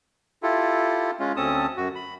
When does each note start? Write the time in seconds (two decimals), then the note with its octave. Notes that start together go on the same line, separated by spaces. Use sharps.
0.43 E4 F4 G4 A4
1.19 G#3 C#4 F4
1.36 D2 C4 C#4 A4 A5 D#6
1.77 F#2 F#4
1.95 B5